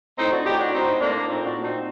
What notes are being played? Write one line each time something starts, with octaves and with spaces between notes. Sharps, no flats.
A2 C4 D#4
D4 F#4
A2 D#4 G4
D4 F#4
A2 C4 D#4
A2 A#3 D4
A#2 C4 D#4
D4 F#4
A#2
C4 D#4